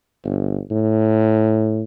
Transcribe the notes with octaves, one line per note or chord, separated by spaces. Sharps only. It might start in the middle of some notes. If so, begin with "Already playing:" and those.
G1
A2